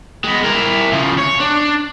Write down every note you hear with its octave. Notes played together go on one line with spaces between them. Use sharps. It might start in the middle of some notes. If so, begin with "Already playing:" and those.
G#3 B3
E4 A#4
C#3 F3
C#5
D4